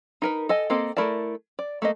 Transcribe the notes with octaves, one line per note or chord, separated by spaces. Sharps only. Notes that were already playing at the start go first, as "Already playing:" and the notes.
D#4 A#4 B4
A4 D#5 G#5
A#3 C4 A4 D#5
A3 E4 A#4 D5 A5
D5
A3 A#3 D#5